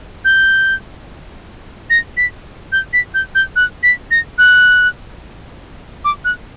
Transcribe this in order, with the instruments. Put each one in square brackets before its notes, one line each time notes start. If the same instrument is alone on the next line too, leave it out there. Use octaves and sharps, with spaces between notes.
[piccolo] G6
A#6
B6
G6
B6
G6
G6
F#6
B6
A#6
F#6
D6
F#6